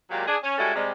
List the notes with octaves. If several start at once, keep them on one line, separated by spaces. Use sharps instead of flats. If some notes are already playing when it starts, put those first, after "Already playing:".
A#2 F#3 G#3 A#3 G4
D4 G#4
C#4
G3 G#3 C#4 E4 F#4 A4
C3 G3 G#3